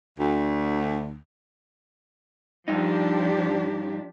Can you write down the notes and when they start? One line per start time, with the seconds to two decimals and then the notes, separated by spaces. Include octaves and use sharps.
0.18 D2
2.68 G2 F3 D4 D#4 G4